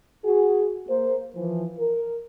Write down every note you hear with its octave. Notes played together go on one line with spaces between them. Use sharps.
F#4 G#4
A#3 C5
E3 F3
A#4